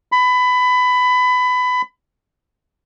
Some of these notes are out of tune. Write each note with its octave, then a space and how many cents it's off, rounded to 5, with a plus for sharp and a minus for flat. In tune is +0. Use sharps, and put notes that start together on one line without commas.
B5 +20